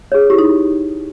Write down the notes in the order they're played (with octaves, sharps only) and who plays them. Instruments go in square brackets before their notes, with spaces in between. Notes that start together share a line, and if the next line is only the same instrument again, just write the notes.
[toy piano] G#4 C#5
[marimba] E4 [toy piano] G4
[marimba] D#4